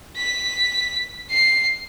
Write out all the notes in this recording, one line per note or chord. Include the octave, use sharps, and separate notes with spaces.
B6
C7